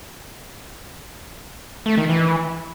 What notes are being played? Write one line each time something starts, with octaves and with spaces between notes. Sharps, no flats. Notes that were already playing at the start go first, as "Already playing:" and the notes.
A3
D#3
E3